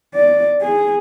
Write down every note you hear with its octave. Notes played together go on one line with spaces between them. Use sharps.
D5
G#4